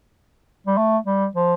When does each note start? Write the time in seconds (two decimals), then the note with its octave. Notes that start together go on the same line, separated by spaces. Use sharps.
0.66 G3
0.77 A3
1.06 G3
1.35 F3